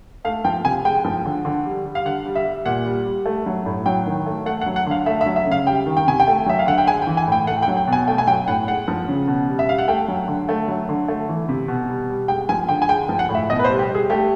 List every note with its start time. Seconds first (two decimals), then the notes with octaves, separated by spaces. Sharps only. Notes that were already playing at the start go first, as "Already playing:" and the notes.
0.25 A3 F5
0.45 F3 G5
0.65 C3 G#5
0.85 G#3 G5
1.05 F3
1.25 D3
1.45 D3
1.65 G3
1.85 G3
1.95 F5
2.05 D3 F#5
2.25 G3
2.35 E5
2.45 G3
2.66 A#2 F#5
2.86 G3
3.05 G3
3.26 A3
3.46 F#3
3.66 A2
3.86 F#3 G5
4.06 D#3
4.26 A3
4.46 A3 F#5
4.61 F#5
4.66 F#3
4.76 F#5
4.86 D3 F5
5.06 A3 E5
5.21 E5
5.26 F#3
5.36 E5
5.46 C#3
5.51 F5
5.67 G3 G5
5.86 D#3
5.97 G5
6.07 C3 G#5
6.20 G5
6.27 A3
6.46 F#3 E5
6.59 F5
6.66 D3 F#5
6.78 G5
6.87 G#3 G#5
7.02 G5
7.07 E3
7.17 G#5
7.27 A2 G5
7.47 A3 F#5
7.63 G5
7.68 F#3
7.77 G5
7.87 B2
7.93 G#5
8.08 A3 G5
8.18 G#5
8.27 F#3 G5
8.48 A2 F#5
8.68 G#3 F#5
8.88 F3
9.08 C#3
9.28 B2
9.48 G3
9.59 E5
9.68 G3 F5
9.78 F#5
9.88 A3 G5
10.08 F#3
10.28 D3
10.49 A3
10.68 F#3
10.89 D3
11.08 A3
11.29 E3
11.49 C3
11.68 B2
11.89 G3
12.09 G3
12.28 G#3 G5
12.49 F3 G#5
12.69 D3 G5
12.82 G#5
12.89 G#3 G5
13.09 F3
13.19 F#5
13.29 A2
13.35 E5
13.50 B2 D#5
13.59 B4
13.64 C5
13.70 G3
13.79 G4
13.89 G3
13.95 G#4
14.10 A3 G4